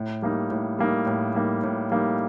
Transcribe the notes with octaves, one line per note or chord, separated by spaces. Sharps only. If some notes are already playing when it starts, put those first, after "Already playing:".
Already playing: A2
G3 A#3 D#4
A2
G3 A#3 D#4
A2
G3 A#3 D#4
A2
G3 A#3 D#4